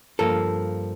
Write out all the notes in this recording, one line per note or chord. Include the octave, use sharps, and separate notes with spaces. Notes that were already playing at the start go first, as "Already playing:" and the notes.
G2 F3 A#3 A4